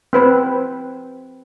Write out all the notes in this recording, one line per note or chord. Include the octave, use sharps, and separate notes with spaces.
C4 B4 C5